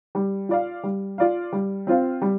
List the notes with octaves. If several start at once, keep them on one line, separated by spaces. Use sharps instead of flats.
G3
F4 D5 F5
G3
F4 D5 F5
G3
C4 F4 C5 F5
G3